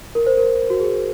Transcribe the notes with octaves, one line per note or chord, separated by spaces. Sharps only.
A#4
C5
A#4
F#4
G#4